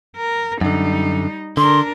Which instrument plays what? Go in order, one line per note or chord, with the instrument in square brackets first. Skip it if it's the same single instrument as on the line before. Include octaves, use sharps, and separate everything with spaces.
[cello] A#4
[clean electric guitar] F#2 D3 [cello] G3 D#4
[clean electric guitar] D3 [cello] D4 A#4 [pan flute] C6